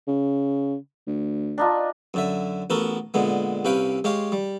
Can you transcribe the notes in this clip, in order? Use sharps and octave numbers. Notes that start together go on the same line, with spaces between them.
C#3
D2
D4 D#4 F4
F#2 D3 E5
A1 B3 F#4 A4 A#4
A#2 D3 G#3 B3
C2 C3 C#4 B4 F5 G5
G#3 G4 C#5 F5 C6
G3